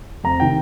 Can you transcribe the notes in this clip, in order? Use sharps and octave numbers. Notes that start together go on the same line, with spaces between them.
F2 A#5
C3 D#3 G5